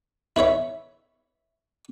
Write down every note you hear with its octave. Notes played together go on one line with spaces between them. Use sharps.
E4 B4 C#5 E5